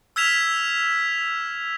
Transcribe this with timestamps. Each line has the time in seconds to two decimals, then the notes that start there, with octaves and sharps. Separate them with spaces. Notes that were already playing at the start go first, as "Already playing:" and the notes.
0.16 E6 F6 G#6 B6 E7 F7